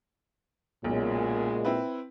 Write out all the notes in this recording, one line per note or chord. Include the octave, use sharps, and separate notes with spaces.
B1 F#2 A#2 C#3 G#3
C4 E4 B4